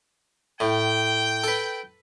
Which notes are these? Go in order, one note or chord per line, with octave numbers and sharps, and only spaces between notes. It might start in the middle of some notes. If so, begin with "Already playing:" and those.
A2 G5
A4 B4